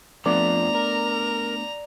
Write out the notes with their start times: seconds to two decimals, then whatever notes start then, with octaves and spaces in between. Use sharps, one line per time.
0.26 F2 F3 A3 B3 D4 D5 A#5
0.75 A#4